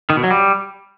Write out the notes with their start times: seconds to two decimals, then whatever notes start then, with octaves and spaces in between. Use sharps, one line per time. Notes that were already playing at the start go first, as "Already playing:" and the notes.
0.10 D#3
0.17 B2
0.24 F#3
0.31 G3